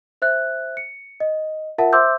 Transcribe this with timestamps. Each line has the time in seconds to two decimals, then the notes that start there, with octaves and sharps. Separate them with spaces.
0.22 C5 E5 F#6
0.77 C#7
1.20 D#5
1.78 F4 A#4 E5 F#5 A5
1.93 C5 E5 C6 D6 E6 G6